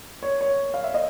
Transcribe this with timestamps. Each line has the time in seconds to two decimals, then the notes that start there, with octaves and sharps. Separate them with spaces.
0.23 C#5
0.41 C#5
0.74 F5
0.84 E5
0.94 D#5